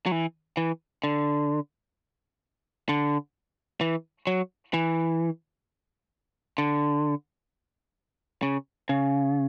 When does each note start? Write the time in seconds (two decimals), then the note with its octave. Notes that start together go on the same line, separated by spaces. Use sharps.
0.06 F#3
0.12 E3
0.57 E3
1.04 D3
2.89 D3
3.81 E3
4.27 F#3
4.74 E3
6.58 D3
8.43 C#3
8.89 C#3